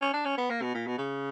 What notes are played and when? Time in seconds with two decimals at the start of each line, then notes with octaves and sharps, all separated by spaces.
0.01 C#4
0.13 D4
0.25 C#4
0.38 B3
0.50 A#3
0.62 B2
0.74 A#2
0.87 B2
0.98 C#3